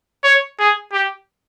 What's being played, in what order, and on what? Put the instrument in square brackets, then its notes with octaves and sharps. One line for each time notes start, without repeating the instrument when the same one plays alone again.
[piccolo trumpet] C#5
G#4
G4